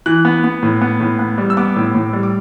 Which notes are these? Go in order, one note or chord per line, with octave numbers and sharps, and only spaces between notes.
E3 F#6
B3
B3
A2
B3
A2
B3
G3
E6
B3 D6
A2
A2
G3
D6